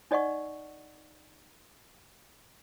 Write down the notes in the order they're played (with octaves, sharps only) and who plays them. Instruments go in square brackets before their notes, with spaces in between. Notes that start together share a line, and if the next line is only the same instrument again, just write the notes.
[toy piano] D#4 D5 D#5 F#5 C#6